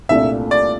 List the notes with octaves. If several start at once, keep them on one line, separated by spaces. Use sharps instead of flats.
C2 A#2 A3 D4 E5
D5